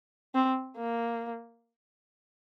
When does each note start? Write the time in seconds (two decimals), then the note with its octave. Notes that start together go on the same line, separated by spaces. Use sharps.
0.35 C4
0.77 A#3